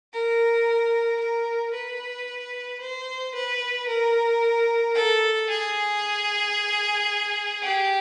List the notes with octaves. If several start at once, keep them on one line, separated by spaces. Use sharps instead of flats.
A#4
A#4
B4
C5
B4
A#4
A4
G#4
G4